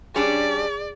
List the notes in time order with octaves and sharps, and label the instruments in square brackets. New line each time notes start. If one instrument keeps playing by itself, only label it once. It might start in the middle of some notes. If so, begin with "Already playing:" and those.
[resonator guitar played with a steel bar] G3 C#4 D4 [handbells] G#4 [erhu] D5